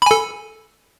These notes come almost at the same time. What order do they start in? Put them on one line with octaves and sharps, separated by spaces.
B5 G#5 A4